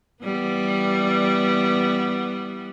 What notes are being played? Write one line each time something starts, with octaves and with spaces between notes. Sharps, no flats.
E3 G3 B3